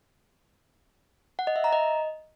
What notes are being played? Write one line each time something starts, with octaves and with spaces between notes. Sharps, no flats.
F#5
D#5
E5
A#5
D#5